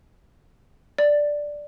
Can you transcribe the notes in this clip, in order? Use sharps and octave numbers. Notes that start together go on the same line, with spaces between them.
D5